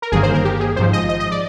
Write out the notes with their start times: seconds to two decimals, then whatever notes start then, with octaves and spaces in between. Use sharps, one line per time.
0.02 A#4
0.12 G1 G2 D#3 A#3 G#4
0.23 C5
0.34 A#4
0.45 G4
0.60 G#4
0.76 G#1 G#2 F3 C5
0.93 D#5
1.09 D#5
1.20 D#5
1.31 D5